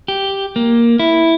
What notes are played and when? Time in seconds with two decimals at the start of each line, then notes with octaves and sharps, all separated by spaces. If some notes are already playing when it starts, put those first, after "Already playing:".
0.08 G4
0.56 A#3
1.00 E4